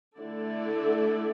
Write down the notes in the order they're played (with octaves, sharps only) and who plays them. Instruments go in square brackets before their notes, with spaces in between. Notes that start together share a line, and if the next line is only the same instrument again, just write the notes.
[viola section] D3 A3 E4 A4 D5